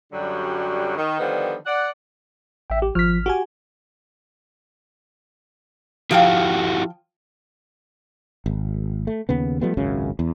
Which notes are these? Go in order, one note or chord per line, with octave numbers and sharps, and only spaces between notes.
F#2 D3 F#3 G3
D#3
D3 D#3 F3 G3 B3
D5 F#5
A1 E5 G5
G4
G#1 F3 F6 B6
F#4 G4 G#5
F3 E4 F#4 G4 F5 G5
G#1
A3
D#2 C#3 B3
F3 G3 A3 B3
G#1 C#2 F#2 C#3
E2